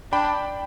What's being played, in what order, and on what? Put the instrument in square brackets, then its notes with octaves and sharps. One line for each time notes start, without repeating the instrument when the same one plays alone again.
[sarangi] D4 [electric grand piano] G5 B5